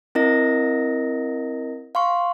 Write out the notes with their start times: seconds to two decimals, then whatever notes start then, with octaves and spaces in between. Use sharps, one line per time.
0.15 C4 E4 A#4 D#5 A#6
1.95 F5 C6 C#6